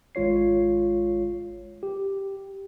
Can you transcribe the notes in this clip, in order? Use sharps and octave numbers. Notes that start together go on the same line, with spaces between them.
G#1 G#3 F4 C#5 C7
G4